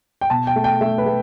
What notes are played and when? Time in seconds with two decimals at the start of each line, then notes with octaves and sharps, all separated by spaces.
0.21 G5
0.30 B2 A5
0.47 G5
0.56 A3
0.64 G5
0.81 A3 E5
0.98 B4
1.06 A3